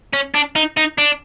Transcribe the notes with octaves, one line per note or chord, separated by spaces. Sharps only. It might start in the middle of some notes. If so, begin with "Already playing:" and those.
C#4
D4
D#4
D#4
D4